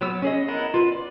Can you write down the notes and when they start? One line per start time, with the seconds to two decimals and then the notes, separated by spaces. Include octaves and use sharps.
0.01 F#3 B3 E6
0.22 C#4 G#4 D#5
0.48 B3 E4 A#4 D#5 F#5
0.74 F4 B4
0.92 D5